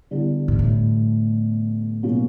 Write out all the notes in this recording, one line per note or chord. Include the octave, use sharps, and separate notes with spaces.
D3 G3 B3 E4
G#2
A2
B2 F#3 A#3 C#4